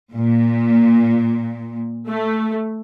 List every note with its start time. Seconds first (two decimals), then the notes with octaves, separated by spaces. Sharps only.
0.13 A#2
2.08 A3